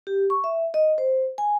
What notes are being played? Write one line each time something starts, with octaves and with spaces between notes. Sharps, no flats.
G4
C#6
E5
D#5
C5
G#5